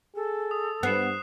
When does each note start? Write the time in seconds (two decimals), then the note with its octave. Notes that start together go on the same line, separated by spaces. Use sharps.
0.15 G#4 A4
0.51 D#6
0.83 G2 B3 F#6 C7 E7